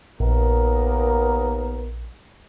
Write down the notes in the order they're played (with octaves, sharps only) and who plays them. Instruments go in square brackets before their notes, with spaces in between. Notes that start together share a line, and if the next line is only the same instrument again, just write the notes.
[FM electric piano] A#1 [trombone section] D#2 B3 A#4